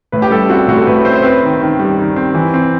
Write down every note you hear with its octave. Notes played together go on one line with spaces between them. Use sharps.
A2 B4
G4
G3 A4
C4 F#4
A2 F#4
A4
A2 B4
C4 C5
C5
C4 B4
D#3
D#3
G3
D#3
C4
E3
C4